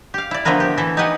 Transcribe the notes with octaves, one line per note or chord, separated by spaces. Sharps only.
G4 F5
E4 D5
D3 F3 A3 B3 A#4 B4
G4
E3 E4 A4 E5
D#4 G4 B4 D#5 F#5 G#5